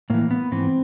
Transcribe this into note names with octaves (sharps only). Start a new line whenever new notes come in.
A2 E3 A#3
B3
G#2 E3 C4